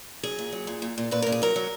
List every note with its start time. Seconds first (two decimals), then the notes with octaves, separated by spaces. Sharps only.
0.23 F#3 G#4
0.39 A#2
0.53 F#3
0.67 A#2
0.82 A#2
0.98 A#2
1.11 A#2 B4
1.22 A#2 A#4
1.32 G#4
1.42 F#3 A#4
1.56 F#3